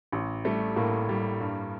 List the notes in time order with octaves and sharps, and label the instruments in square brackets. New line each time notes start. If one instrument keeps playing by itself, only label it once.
[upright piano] A1
G3 A3
A2 A#3
G3
G2